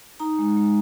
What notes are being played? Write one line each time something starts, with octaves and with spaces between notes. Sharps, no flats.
D#4 A#5
G#3
G#3